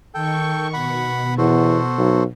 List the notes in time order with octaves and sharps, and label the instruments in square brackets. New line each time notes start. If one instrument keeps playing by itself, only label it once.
[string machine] D#3 C#6 [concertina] A4 G5
[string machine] B2 [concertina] F#5 B5
[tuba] E2 [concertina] F#4 A4 C5
[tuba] B1